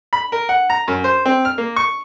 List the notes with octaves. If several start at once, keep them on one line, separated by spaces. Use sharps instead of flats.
B5
A#4
F#5
A#5
F#2
C5
C4
F6
A#3
C#6